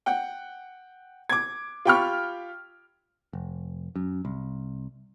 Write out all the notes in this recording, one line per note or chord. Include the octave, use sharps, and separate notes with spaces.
F#5 G5
D6 G#6
F4 G4 G5 B5 C#6 F6
F1
F#2
C2